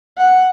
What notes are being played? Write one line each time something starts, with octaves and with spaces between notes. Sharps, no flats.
F#5